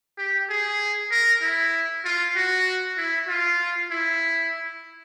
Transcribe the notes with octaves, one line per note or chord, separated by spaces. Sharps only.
G4
G#4
A#4
E4
F4
F#4
E4
F4
E4